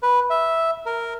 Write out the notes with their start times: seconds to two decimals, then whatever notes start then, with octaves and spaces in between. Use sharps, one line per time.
0.03 B4
0.30 E5
0.86 A#4